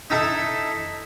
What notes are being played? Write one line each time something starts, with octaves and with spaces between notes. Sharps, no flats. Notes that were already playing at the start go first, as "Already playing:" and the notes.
D#4 E4 A4 E5